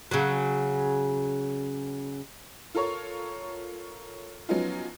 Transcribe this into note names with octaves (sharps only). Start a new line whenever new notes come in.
C#3 F#3
F4 A4 A#4 C#5 C#6
F3 F#3 B3 C#4 D#4 F4